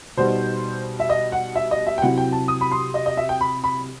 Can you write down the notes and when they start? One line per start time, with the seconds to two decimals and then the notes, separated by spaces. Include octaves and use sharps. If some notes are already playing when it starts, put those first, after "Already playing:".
0.17 B2 G3 B3 D#4 C5
1.00 E5
1.09 D#5
1.32 F#5
1.55 E5
1.71 D#5
1.86 E5
1.98 G5
2.02 C3 F#3 C4 E4 F#5
2.17 G5
2.32 A5
2.48 D#6
2.61 B5
2.71 C6
2.94 D#5
3.06 D#5
3.17 E5
3.29 G5
3.41 B5
3.64 B5